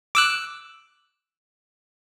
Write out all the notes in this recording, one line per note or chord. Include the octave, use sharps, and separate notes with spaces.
D6 E6 F#6